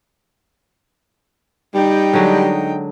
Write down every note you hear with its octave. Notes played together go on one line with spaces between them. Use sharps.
G3 D#4 G5
D3 F#3 G#3